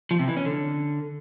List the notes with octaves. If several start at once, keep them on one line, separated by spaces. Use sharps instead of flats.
F3
C3
E3
C#4
D3